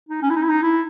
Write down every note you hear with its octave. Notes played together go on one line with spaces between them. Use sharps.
D#4
C#4
E4
D#4
E4
D#4
E4